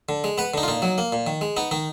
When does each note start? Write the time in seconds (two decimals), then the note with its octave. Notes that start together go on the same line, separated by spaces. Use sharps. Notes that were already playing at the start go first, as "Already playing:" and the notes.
0.09 D3
0.24 G#3
0.38 B3 B4
0.54 D3 D#4
0.63 F4
0.68 A#2 D#4
0.82 F#3
0.98 A#3
1.12 A#2
1.27 D#3
1.41 G#3
1.57 B3 D#4
1.71 D#3 D#4